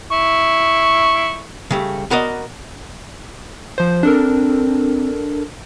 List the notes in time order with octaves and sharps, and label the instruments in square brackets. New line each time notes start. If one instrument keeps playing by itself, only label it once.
[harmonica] E4 C#6
[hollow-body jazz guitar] C#3 G3 A3
B3 F#4 A#4 D5 D#5
[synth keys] F3 C5
[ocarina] C4 [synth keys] D4 A4 A#4